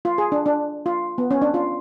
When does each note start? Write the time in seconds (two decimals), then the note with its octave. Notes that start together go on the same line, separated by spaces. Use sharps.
0.05 F4
0.18 G#4
0.32 D4
0.46 D4
0.86 F4
1.18 B3
1.31 C#4
1.42 D4
1.54 F4